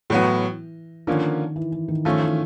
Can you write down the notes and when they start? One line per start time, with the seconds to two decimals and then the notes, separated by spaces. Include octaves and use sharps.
0.10 A2 E3 F#3 B3
1.07 D3 D#3 F3 A#3 C#4
1.56 E3
1.72 E3
1.88 D#3
2.05 D#3 F3 A3 C#4
2.22 E3